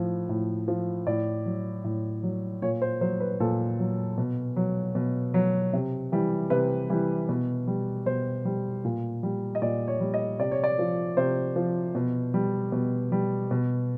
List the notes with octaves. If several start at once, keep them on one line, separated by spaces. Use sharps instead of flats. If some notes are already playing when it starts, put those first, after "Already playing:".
Already playing: A2 F3
A2
F3
A2 D5
F#3
A2
F#3
A#2 C#5
C5
F#3 C5
B4
A#2 A4
F#3
B2
F#3
B2
F#3
C3
E3 G3
C3 B4
E3 G3
B2
G3
B2 C5
G3
A#2
G3
D#5
A#2 D5
C#5
G3
D#5
C3 D5
C#5
D5
F3
C3 C5
F3
B2
G3
B2
G3
B2